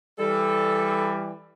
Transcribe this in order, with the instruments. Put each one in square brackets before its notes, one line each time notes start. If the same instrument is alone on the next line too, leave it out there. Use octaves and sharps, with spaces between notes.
[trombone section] E3 G3 [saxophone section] A4